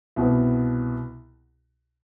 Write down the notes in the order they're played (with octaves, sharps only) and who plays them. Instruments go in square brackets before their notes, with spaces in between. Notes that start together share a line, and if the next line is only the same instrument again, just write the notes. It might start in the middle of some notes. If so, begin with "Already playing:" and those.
[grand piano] C2 B2 B3